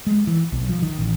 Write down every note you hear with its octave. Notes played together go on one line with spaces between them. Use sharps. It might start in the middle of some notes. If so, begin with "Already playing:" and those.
G#3
E3
B1
F3
D#3
A1